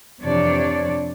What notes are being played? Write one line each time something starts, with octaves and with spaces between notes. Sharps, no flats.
F2 C3 E3 D4 C#5 D5